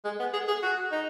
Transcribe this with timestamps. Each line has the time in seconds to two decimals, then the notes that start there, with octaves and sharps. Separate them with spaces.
0.05 G#3
0.20 B3
0.33 G#4
0.48 G#4
0.63 F#4
0.92 D#4